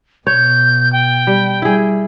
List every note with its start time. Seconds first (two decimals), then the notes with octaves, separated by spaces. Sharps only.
0.27 B2 C#5 G6
0.93 G5
1.27 G3
1.62 G3 E4 G#4